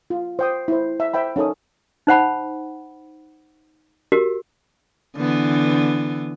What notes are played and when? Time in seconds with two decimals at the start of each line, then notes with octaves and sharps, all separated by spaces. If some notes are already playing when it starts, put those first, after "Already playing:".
0.10 F4
0.39 C5 G5 D#6
0.68 E4 C5
1.00 E5
1.13 C5 E5 G5 B5
1.36 C#4 D#4 A4 A#4 D#6
2.07 D#4 C5 F#5 B5
4.12 F#4 G4 A#4
5.16 D3 E3 B3